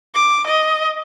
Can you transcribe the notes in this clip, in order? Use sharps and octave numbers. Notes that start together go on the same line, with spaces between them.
D6
D#5